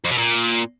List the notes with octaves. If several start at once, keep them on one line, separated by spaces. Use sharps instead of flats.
F2
B2
A#2